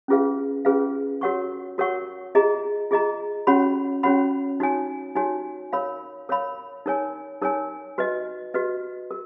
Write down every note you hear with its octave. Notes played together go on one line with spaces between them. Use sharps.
C#4 F4 G#4 B4 F5
C#4 F4 G#4 B4 F5
F#4 A#4 C#5 F#5 C#6
F#4 A#4 C#5 F#5 C#6
F4 G#4 D#5 A#5
F4 G#4 D#5 A#5
C#4 F#4 C#5 F#5 B5
C#4 F#4 C#5 F#5 B5
D#4 F#4 C#5 G#5
D#4 F#4 C#5 G#5
A#4 C#5 F5 B5
A#4 C#5 F5 B5
D#4 A#4 C#5 G#5
D#4 A#4 C#5 G#5
F#4 B4 D#5
F#4 B4 D#5
A#4